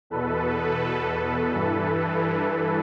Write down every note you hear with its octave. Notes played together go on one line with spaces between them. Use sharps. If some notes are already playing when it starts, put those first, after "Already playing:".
E2 B2 A4 B4
G2 E3